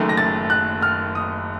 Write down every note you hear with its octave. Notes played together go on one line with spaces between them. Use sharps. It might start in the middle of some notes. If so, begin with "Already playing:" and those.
Already playing: F#1 F#2 D#3 A3
A#6
A6
F#6
F6
D#6